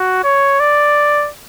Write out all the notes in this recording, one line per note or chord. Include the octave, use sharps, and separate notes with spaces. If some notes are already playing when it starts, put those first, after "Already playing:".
Already playing: F#4
C#5
D5